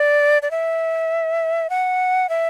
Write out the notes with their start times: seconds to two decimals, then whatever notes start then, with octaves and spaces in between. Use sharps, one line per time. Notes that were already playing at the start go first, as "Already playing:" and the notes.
Already playing: D5
0.42 D5
0.51 E5
1.70 F#5
2.29 E5